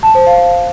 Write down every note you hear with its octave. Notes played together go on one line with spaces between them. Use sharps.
A5
C5
F5